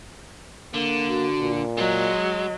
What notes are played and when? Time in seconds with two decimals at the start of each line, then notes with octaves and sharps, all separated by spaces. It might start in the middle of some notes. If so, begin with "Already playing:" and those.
0.74 D3 A#3
1.08 F#4
1.40 A#2
1.77 F#3 G#3 D#5